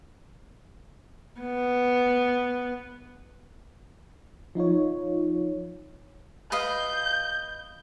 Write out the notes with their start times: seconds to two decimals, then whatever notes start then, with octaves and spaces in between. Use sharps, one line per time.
1.41 B3
4.55 F3 D#4 F4 C#5
6.52 B4 D#5 F5 G6